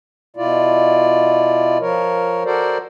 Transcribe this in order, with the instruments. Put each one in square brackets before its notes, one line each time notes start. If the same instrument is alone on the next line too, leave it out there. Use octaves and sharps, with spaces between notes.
[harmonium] B2 E4 F4 D5
F3 A#4 C#5
F#4 A4 A#4 C5 D5